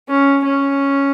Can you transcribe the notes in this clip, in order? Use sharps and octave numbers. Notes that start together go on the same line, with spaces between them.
C#4
C#4